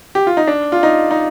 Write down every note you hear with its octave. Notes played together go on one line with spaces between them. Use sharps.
G4
F4
D#4
D4
F4
D#4
D#4